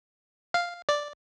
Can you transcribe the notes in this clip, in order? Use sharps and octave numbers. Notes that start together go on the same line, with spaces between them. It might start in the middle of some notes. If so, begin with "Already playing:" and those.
F5
D5